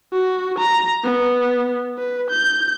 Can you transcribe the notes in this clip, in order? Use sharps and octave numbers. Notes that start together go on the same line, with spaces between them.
F#4
A#5
B3
B4
G6